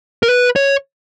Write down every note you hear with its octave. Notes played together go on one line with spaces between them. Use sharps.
A#4
B4
C#5